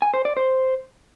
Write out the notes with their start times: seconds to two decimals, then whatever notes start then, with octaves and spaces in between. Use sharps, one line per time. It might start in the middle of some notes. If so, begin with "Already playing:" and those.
0.02 G#5
0.14 C5
0.25 D5
0.37 C5